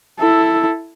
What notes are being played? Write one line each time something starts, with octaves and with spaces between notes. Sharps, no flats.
E4 A4